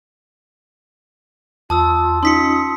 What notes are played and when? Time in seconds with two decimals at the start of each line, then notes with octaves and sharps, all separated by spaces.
1.70 E2 F4 A5 D#6 E6
2.23 C#4 D#4 F4 C6 D#6 B6 C#7